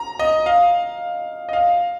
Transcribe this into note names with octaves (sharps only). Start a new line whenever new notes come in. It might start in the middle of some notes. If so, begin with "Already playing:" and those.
Already playing: A#5
D#5
F5
D#5
F5